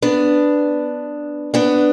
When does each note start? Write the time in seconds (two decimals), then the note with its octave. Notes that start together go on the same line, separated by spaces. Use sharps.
0.02 B3 D4
1.54 B3 D4